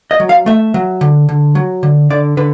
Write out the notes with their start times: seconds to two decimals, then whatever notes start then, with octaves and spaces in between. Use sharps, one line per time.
0.11 D#5
0.20 F#3
0.29 F5
0.46 A3 E5
0.74 F#3
1.01 D3
1.29 D3
1.55 F#3
1.83 D3
2.10 D3 D5
2.37 D3 B4